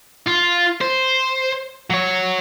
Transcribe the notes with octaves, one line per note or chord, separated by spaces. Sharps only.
F4
C5
F#3 C#5